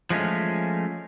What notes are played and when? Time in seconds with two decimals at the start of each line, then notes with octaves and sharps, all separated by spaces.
0.10 F3 G#3 A3 C#4